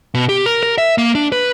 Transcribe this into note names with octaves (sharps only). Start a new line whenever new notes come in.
B2
G4
A#4
A#4
E5
A#3
D4
B4